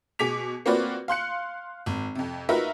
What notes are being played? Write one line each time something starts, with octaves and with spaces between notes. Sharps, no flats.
B2 G#4 D6 B6 F7
A#3 C4 F4 F#4 B4 D5
F5 C6 F#6 C#7
G#1
F2 C3
D#4 F4 F#4 A#4 B4 E5